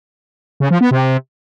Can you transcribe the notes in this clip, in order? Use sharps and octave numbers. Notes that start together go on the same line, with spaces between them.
C#3
F3
B3
C3